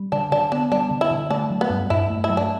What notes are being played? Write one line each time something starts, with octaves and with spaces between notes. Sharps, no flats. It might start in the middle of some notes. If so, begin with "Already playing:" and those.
Already playing: G3
D3 D4
D3 D4
B3 D4
G3 D4
D3
E4
D3
A3 D4
F#3
B3
G2
G2 E4
A3
E4
F#3
D4